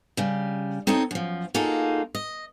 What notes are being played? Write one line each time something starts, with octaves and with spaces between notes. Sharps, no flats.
C#3 G3
C4 D#4 A4 C#5 D#5
F#2 F3
A#3 D#4 F4 F#4 G#4 A4
D#5